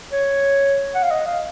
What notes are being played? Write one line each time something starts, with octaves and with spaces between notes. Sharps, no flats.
C#5
F#5
F5
D#5
F5